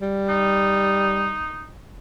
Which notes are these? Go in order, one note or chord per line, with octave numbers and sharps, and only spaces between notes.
G3
D#4